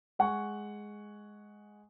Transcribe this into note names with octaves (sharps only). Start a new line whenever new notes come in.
G#3 F#5 G#5 C#6